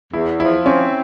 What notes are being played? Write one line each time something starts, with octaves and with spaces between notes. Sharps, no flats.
E2 E4
F3 E4
C4 C#4